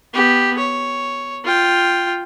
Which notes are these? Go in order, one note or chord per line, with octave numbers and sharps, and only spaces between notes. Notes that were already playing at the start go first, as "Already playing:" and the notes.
B3 G4
C#5
F4 G5